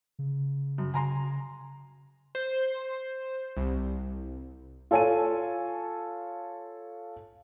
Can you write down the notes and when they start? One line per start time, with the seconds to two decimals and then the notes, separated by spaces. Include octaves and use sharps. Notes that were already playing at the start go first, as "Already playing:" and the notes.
0.19 C#3
0.78 F#2
0.94 C#3 G#5 A#5 C6
2.35 C5
3.57 C2
4.91 F4 A4 C#5 G#5 A5 D#7